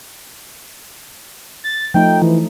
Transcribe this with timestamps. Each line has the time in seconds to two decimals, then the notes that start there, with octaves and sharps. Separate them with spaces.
1.64 A6
1.94 F3 A3 D#4 G5
2.22 E3